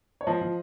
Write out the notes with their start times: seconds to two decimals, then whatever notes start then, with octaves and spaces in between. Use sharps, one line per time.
0.21 C#5
0.27 F3 C5 D#5
0.41 F3